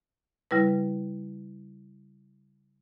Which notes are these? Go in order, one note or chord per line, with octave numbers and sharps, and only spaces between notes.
C#3 G3 E4 B4